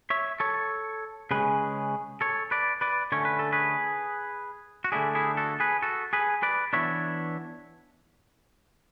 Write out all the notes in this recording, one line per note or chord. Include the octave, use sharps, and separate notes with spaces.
C#5 E5
A4 C#5
C#3 G#3 C#4 G#4 B4
A4 C#5
B4 D5
B4 D5
D3 A3 C#4 C#5
B4
A4
G#4 B4
F#4
D3 A3 D4 E4 G#4
E4 G#4
F#4 A4
G#4 B4
F#4 A4
G#4 B4
B4 D5
E3 B3 D4 C#5 E5